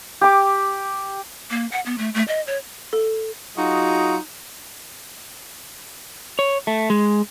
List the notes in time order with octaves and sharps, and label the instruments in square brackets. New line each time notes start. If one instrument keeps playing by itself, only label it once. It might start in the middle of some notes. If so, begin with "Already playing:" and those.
[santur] G4 D6
[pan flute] A#3
F#5
B3
A3
A3
D#5
C#5
[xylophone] A4
[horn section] F#3 D#4 F4 F#4 G#4 D#5
[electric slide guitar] C#5
A3
G#3